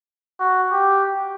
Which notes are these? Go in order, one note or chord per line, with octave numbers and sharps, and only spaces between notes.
F#4
G4